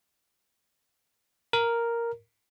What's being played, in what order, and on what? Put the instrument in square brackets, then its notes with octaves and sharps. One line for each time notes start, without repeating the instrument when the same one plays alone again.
[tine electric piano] A#4